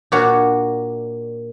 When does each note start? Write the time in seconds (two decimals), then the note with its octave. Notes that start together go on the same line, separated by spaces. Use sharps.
0.12 A#2 A#3 D4 F#4 C#5